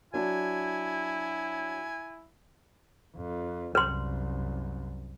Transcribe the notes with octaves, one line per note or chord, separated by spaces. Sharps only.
F#3 D4 E4 G#5
F2
C2 F#2 B4 C6